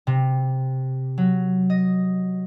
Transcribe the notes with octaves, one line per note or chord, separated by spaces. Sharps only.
C3
F#3
D#5